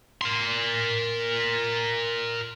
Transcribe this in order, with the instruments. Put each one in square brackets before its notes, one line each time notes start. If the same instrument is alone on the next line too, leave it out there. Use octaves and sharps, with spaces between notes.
[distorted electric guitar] A#4 C6